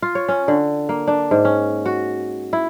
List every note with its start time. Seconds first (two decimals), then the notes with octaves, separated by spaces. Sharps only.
0.02 F4
0.15 C#5
0.28 C#4
0.48 D3
0.89 A#3
1.07 D4
1.31 G#2
1.45 C#4
1.86 F#4
2.53 E4